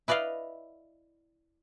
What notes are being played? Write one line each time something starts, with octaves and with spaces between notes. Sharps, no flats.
E4 B4 D5 D#5 F5